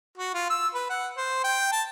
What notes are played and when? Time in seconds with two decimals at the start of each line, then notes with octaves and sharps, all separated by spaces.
0.18 F#4
0.34 F4
0.50 E6
0.74 B4
0.90 F#5
1.17 C5
1.44 G5
1.72 A5